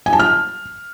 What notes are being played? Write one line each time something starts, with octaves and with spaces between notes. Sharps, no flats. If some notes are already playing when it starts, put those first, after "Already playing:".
G#5
A5
F6